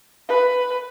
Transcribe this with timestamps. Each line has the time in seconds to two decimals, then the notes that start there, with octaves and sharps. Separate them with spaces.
0.29 B4